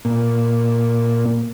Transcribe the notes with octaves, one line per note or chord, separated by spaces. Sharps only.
A#2